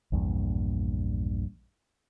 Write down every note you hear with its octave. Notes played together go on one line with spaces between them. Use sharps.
A#1 E2 G2 A#2